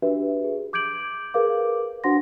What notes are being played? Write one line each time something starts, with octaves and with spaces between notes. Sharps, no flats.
D4 F#4 G4 B4 E5
G#4
D6 G6 G#6 D7 F#7
G#4 A#4 B4 F5 D6
D4 F#4 C5 F#5 C6 A#6